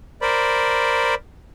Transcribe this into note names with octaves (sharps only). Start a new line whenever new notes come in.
A#4 C5 D5 B5